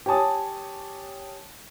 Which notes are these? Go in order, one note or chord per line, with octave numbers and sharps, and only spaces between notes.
G4 C#5 G#5 A5 D#6